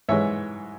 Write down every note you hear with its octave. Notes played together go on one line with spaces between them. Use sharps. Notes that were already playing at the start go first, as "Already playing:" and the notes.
G#2 E3 G#3 C#5 E5